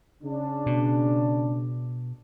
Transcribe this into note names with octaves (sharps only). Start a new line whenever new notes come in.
C#3 D4
B2